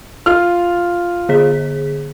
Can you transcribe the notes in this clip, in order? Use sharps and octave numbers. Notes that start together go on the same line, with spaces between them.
F4 F6
D3 G#4 B6